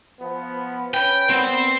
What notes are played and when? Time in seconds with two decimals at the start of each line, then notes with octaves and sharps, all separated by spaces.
0.20 F3 B3
0.94 C#4 B4 G5
1.30 A#2 B3 C4